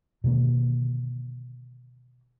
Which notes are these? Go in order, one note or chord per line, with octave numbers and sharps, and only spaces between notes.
B2 D3 D#3 A#3